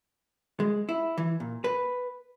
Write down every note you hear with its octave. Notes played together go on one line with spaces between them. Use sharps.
G#3
E4
E3
A#2
B4